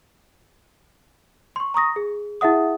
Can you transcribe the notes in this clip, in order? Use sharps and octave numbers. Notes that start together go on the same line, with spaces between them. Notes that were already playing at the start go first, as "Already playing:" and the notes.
C6 C#6
A#5 C#6 D#6 A#6
G#4
E4 G#4 E5 F#5 D#6